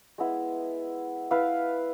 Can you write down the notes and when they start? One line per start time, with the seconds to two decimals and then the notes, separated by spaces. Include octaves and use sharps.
0.18 G#3 B3 E4
1.31 E4 B4 F5